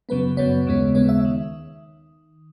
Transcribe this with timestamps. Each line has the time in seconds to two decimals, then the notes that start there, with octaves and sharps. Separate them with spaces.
0.09 F#2 C#3 F#3 B3 B4
0.37 F#2 C#3 F#3 B3 C#5
0.67 D#2 C#3 G#3 B3
0.95 D#2 C#3 G#3 B3 C#5
1.09 E5
1.25 D#3